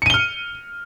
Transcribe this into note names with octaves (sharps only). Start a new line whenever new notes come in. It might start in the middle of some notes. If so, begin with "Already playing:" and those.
F6 C#7 D#7 G7